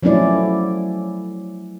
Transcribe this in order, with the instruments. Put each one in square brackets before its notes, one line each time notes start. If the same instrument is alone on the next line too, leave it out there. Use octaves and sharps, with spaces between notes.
[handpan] F3 F#3 A3 C#4 E4 D5